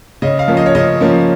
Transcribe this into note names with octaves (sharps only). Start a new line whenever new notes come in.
C#3 D#5
F5
F3 A#3 C#4
D#5
C#5
C#3 D#5
F3 A#3 C#4